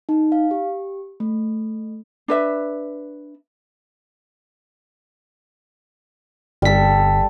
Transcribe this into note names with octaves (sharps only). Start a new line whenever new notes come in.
D#4
F5
G4
A3
D4 B4 E5
G1 G3 A4 B6